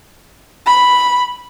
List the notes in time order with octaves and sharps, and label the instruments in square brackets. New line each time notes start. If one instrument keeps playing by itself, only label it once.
[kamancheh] B5